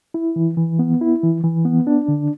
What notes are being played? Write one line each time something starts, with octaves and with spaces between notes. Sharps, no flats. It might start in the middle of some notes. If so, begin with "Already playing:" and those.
E4
E3
E3
B3
E4
E3
E3
B3
D4
D3